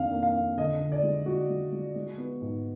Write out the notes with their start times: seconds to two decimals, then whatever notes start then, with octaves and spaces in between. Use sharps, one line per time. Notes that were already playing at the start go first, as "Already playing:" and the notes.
Already playing: F2 D#3 A#3 D4 F5
0.12 A#3
0.23 F5
0.34 F2
0.58 D3 D#5
0.80 D3
0.92 D5
1.03 G#3
1.26 G#3 F#4
1.50 G#3
1.72 G#3
1.96 G#3
2.18 B3
2.42 G#2